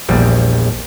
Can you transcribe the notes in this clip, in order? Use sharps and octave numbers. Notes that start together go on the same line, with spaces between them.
A#1 E2 G3